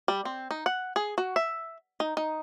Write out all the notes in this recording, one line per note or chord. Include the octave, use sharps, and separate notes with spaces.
G3
C4
D#4
F#5
G#4
F#4
E5
D#4
D#4